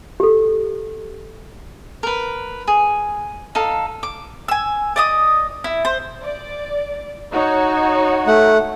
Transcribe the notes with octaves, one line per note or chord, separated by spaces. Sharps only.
G4 A4
A#4 B4
G#4
D#4 A4 F5
D6
G#5 E6
D5 D#5 D#6
E4
C5
D5
D#4 F#4 C#5
A3 F#5